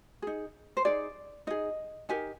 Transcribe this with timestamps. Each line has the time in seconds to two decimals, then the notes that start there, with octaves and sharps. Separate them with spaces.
0.22 D#4 G#4
0.77 C5
0.85 D#4 G#4 D5
1.47 D#4 G#4 D#5
2.09 D#4 G4 A#4 G#5